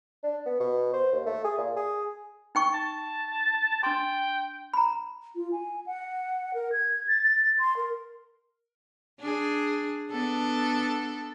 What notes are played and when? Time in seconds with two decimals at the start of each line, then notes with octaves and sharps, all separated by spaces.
0.24 D4
0.46 B3
0.60 B2
0.93 C5
1.12 D#2
1.26 A3
1.45 G#4
1.58 A#2
1.77 G#4
2.55 D#4 G5 C#6
2.74 A5
3.83 D4 G5 C6
4.74 A#5 B5
5.36 F4
5.52 G#5
5.86 F#5
6.54 A#4
6.73 G#6
7.08 A6
7.23 A6
7.59 C6
7.77 A#4
9.20 D4 G#4
10.11 B3 D4 A4